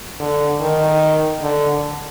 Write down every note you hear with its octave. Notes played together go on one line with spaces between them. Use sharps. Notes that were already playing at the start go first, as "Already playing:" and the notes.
D3
D#3
D3